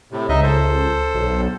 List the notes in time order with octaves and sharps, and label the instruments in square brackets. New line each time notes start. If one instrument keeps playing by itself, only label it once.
[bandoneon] A2 C3
[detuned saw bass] C#2 [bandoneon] D#4 D#5 E5
[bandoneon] A4 C5
[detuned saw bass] B1